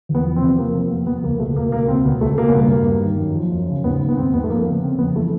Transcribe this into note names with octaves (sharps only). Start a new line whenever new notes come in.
E2
B3
F3
C4
C3
F3 A#3
F3 A#3
F2 B3
F2 B3
C#2 A#3
B2 A3
B2 A#3
C#2 A#3
B2 C4
C#2 B3
C#2 A3
B2 A#3
B3
G2 A#3
G2
G2
D#3
F#2
F3
F#2
C#3
G#2 B3
D#3
B3
G#2 C4
G#2 B3
A3
F3 A#3
C#3 B3
C#3 C4
F2 B3
E3 A3